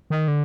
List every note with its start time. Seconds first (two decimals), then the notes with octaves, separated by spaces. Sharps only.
0.10 D#3
0.28 D3